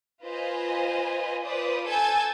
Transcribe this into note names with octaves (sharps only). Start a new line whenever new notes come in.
F4 B4 C5 D#5 G#5
F4 B4 C5 D5 D#6
A4 G#5 E6 G6 A6